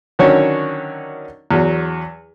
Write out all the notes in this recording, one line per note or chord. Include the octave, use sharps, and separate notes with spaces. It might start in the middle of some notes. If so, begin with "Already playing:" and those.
D3 D#3 F#3 C#4 C#5
E2 F#3